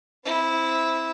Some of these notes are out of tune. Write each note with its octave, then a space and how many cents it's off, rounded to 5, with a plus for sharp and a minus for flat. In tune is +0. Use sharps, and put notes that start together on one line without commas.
C4 +0 E4 -10